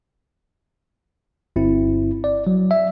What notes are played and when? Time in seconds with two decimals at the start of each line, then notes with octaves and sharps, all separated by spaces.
1.56 G1 C4 E4
2.24 D5
2.47 F#3
2.71 E5